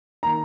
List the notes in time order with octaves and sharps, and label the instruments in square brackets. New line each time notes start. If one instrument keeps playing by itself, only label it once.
[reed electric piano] D#3 A#3 D#4 A#4 [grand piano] A#5